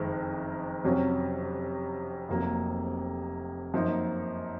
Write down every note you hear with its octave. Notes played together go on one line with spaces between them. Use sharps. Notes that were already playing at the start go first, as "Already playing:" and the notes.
Already playing: F#1 F2 D#3 G#3
F2 C3 F#3 C#4
F1 F2 C3 F#3 A#3
F#2 F3 A#3 D#4